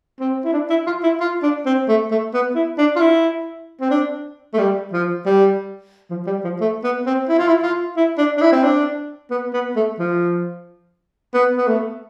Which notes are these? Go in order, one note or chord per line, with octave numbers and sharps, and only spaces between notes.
C4
E4
D4
E4
F4
E4
F4
D4
C4
A3
A3
B3
E4
D4
F4
E4
C4
D4
A3
G3
F3
G3
F3
G3
F3
A3
B3
C4
E4
F4
E4
F4
E4
D4
D4
E4
C4
D4
B3
B3
A3
F3
B3
B3
A3